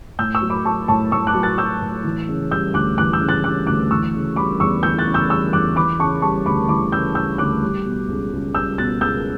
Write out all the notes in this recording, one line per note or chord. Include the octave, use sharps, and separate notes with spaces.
A2 E6 G6
C#6 E6
F#3
B5 D6
F#3 A5 C#6
A2 A5 C#6
A2 C#6 E6
D6 F#6
F#3
F#6 A6
F#3 E6 G6
A2
E3
C#3
G3 E6 G6
D2 D6 F#6
E3 D6 F#6
E6 G6
C#3
F#6 A6
G3 D6 F#6
D2 D6 F#6
E3 C#6 E6
C#3
G3 B5 D6
E2 C#6 E6
E3 E6 G6
F#6 A6
C#3
E6 G6
G3 C#6 E6
E2 D6 F#6
E3 B5 D6
C#3 A5 C#6
G3 A5 C#6
D2 B5 D6
E3 B5 D6
C#3 E6 G6
G3 E6 G6
D2 D6 F#6
G3
B2
C#2
C#2
G3 E6 G6
B2 F#6 A6
C#2 E6 G6